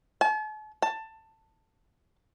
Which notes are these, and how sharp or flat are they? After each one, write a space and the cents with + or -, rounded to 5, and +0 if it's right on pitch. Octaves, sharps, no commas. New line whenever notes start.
A5 -45
A5 +15